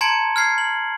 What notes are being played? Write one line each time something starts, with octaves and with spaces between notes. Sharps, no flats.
A5 A#5 C6 G#6 C#7 D7
F6 G#6 C7
F#7